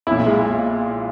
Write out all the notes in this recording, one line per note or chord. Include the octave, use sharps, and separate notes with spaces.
B1 A#2 E4
G#3